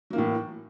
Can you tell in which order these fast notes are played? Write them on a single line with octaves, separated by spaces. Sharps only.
F#3 A#3 E3 A2